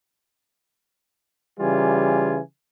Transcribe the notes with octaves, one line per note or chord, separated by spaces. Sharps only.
C#3 E3 G3 F4 G#5